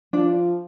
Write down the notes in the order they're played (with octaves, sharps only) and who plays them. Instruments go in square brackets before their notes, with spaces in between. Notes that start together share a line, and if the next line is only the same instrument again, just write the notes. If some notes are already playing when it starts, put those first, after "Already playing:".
[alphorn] F3 [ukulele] D4